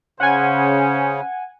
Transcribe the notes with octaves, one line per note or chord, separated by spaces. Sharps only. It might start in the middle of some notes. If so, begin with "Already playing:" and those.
C#3 C#4 C5 F#5 G#5